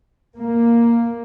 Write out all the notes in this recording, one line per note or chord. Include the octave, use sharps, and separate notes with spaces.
A#3